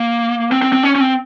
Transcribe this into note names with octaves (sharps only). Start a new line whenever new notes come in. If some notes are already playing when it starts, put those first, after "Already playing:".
Already playing: A#3
C4
C4
C4
C#4
C#4
C4